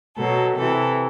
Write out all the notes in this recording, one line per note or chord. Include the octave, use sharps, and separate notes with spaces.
B2 F#3 A4
C3 E3 A4